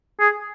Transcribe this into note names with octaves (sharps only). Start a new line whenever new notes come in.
G#4